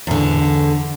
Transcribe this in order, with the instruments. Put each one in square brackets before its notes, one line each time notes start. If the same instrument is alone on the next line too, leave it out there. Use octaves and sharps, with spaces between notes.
[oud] E2 D3